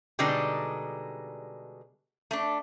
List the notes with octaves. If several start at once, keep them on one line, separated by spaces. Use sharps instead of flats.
B2 D3 G3 G#3 D4 D#4
A3 D4